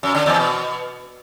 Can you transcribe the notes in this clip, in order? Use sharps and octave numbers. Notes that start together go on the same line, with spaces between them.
F#2
D3
E2
B2